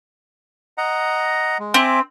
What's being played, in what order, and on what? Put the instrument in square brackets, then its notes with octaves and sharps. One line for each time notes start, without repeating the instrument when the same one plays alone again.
[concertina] D#5 F#5 A#5
G#3
[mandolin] C4 [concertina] E5 G#5 D6